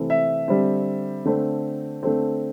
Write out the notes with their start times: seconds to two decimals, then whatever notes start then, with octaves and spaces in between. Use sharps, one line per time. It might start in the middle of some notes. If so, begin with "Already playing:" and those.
Already playing: C3 E3 A3 C4
0.10 E5
0.48 D3 G3 C4
1.25 D3 A3 C4
2.03 D3 A3 C4